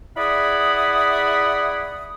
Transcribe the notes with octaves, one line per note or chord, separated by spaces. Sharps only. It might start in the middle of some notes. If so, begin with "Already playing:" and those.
E4 G#4 D5 F#5 B5 D#6